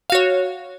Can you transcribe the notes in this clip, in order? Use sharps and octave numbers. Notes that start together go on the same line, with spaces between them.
F#4 C#5 F5